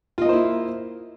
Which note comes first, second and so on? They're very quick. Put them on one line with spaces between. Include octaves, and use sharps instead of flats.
F4 D#5 A#3 C5 E4